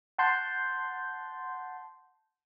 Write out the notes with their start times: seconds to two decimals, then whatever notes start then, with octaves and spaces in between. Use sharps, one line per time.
0.18 F#5 A5 C6 G6